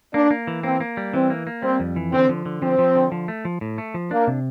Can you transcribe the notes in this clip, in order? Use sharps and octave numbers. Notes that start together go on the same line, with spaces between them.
A#3 D4
A#3
E3
A#3 C4
A#3
G3
E3 C4
A#3
A#3
G3 C4
F2
E3
D3 C4
F3
D3
F3 C4
F3
D3
F3
A3
F3
A2
A3
F3
A#3 D4
C3